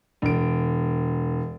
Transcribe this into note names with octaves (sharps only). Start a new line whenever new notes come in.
E1 D7